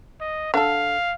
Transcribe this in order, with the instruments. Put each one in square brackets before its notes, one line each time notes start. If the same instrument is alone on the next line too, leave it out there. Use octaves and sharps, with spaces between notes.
[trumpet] D#5
[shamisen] D3 A4 [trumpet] F5